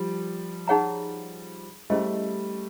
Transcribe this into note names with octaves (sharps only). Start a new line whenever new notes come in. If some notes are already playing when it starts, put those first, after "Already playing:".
Already playing: F3 G3
D#4 G#4 C#5 F#5 A#5
G3 A3 C#4 E4 G#4 C5 D#5